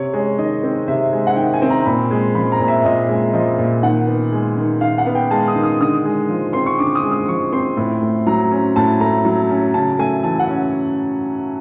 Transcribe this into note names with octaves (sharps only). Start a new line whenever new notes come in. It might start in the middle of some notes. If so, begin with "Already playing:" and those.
Already playing: C3 C#5
G#3 C#5
D#3 D#5
C4
C3 E5
G#3
F#5
D#3 G5
G#5
C4
A#5
A#2 B5
G#3
F3 B5
A#5
A#2
E5
A#2 D#5
G#3 D#5
F3 D#5
A#2
D#3 F#5
B3
G#3
D#3
D#3 F5
F#5
B3
G5
G#3 A5
D#6
D#3
D#6
D3 D#6
G#3
F3
C4 C6
C#6
D3 D6
D#6
G#3
D#6
F3 C#6
C4 C6
A2
A3
F#3 A#5
C#4
A2 A5
A3 A#5
F#3
C#4
C#3 A5
A3 G#5
E3 A5
F#5
C#4